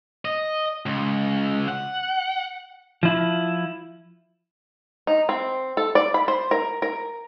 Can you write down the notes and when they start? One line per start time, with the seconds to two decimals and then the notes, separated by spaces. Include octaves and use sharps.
0.25 D#5
0.86 C#2
1.68 F#5
3.03 F3 E4
5.07 D#4
5.29 C4
5.77 A4
5.95 D5
6.14 B5
6.28 C5
6.51 A#4
6.82 A#4